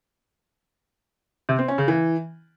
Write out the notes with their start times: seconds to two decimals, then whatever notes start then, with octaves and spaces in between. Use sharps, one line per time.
1.49 C3
1.59 C4
1.68 C#4
1.78 C#3
1.88 E3